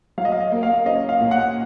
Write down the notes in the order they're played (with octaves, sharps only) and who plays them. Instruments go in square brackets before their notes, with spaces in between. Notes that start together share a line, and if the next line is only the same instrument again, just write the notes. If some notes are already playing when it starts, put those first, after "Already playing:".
[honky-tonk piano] F#3 [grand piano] F5
[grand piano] D#5
F5
D#5
[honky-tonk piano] A#3
[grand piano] F5
[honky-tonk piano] C#4 [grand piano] D#5
[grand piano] F5
[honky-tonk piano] A#2
[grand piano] F#5